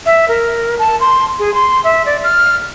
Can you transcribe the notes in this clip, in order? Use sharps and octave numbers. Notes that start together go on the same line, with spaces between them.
E5
A#4
A5
C6
G#4
C6
E5
D5
F6